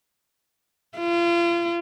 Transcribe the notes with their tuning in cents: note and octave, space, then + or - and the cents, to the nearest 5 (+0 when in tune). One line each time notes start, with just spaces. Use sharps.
F4 -35